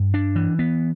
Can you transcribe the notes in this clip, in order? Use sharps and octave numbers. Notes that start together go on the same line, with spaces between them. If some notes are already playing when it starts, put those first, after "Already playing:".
Already playing: G2
D4
E3
B3